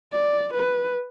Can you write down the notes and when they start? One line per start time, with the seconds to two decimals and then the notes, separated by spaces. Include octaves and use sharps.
0.13 D5
0.53 B4